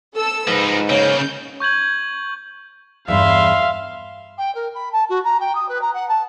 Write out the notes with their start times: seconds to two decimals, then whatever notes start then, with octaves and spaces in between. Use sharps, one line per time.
0.15 A4 E6
0.48 G#2 F3 D#4 B4
0.90 C#3 A#3 C#5 G6
1.60 C#6 G6 G#6 F#7
3.08 E2 G2 E5 F5 C6
4.38 G5
4.55 A#4
4.74 B5
4.92 A5
5.09 F#4
5.24 A#5
5.40 G5
5.55 D#6
5.68 B4
5.81 A#5
5.93 F#5
6.09 A5